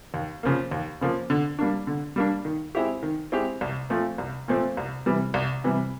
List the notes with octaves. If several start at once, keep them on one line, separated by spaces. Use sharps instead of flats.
D#2
C#3 F3 A#3
D#2
C#3 F3 A#3
D3
G3 A#3 D4
D3
G3 A#3 D4
D#3
G#3 C4 E4 G4
D#3
G#3 C4 E4 G4
C2
A#2 F3 A3 C4
C2
A#2 F3 A3 C4
C2
C3 E3 G3
C2
C3 E3 G3